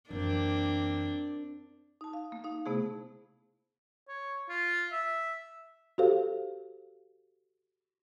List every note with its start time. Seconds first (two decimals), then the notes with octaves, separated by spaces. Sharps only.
0.10 F#2 E3 A#3 C4 D4
2.01 D#4 A5
2.13 F5
2.32 A#3
2.44 D#4 F5
2.66 C3 A3 B3 E4 G#4
4.08 C#5
4.49 F4
4.92 E5
5.98 F#4 G4 A4 C5 F5